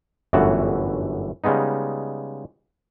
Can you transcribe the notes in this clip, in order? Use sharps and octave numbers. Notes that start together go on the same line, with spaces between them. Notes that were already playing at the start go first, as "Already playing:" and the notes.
G1 F#2 A2 E3 F#4 A5
C#3 G3 G#3 B3 D#4